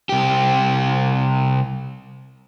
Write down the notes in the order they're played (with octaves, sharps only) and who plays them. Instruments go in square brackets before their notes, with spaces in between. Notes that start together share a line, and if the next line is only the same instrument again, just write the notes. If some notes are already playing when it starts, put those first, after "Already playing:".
[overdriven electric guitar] C2 G4